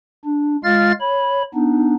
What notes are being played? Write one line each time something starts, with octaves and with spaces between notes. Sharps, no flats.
D4
G#3 F4 F5 F6 A6
C#5 B5
B3 D4 D#4